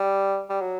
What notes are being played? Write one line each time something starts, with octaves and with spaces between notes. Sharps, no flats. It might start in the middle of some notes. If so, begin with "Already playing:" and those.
Already playing: G3
G3
F#3